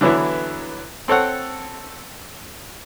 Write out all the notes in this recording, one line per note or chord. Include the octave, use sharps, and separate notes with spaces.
D3 E3 F#3 B3 E4
C4 A4 C#5 F#5